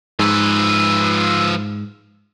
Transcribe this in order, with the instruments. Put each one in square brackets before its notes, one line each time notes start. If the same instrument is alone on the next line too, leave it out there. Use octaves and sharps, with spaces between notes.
[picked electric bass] G#2 [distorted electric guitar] F3 B4 [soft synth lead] E6